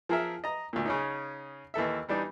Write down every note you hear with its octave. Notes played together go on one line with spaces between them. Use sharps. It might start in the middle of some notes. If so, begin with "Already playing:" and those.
F3 G#4 A#4 E5
D#5 A#5
D2 A#2
C#3 C#4 D#4
D#2 E3 A4 E5
E3 G3 D4 D#4